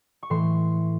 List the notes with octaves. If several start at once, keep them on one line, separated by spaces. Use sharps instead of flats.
C#6
A2 E3 A3 C6